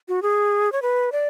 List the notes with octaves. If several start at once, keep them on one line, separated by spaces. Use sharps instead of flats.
F#4
G#4
C#5
B4
D5